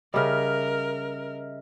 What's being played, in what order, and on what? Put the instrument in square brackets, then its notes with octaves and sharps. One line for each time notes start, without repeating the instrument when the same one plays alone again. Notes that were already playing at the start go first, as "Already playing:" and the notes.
[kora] C#3 G3 [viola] A#4 [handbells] D#5 E5 F6